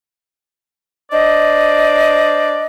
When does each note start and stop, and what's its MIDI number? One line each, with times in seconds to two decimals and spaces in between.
1.11 2.66 62
1.11 2.66 72
1.11 2.66 74
1.11 2.66 75